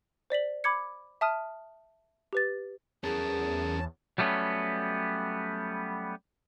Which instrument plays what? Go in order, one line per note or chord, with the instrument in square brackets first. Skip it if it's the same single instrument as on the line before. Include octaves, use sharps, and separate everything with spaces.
[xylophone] C5 D5 B6 F#7
B5 D6 G#6 C#7
E5 A5 D#6 F6 D#7
G4 B4 A6
[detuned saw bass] E2 [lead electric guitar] C#4 A#4 [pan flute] G#4 [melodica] A5
[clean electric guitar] F#3 G3 A3 B3 C#4